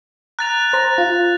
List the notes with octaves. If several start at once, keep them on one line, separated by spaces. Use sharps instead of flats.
A#5 F#6 A6 F7
C5 A#5
F4